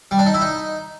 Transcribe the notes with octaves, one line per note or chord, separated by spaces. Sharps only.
G3
D4
D#4
E4
D#4